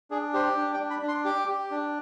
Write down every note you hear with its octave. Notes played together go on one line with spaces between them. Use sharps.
D4 G#4
G4 C5
D4
G5
D4
B5
D4
C6
G4 D6
G4
D4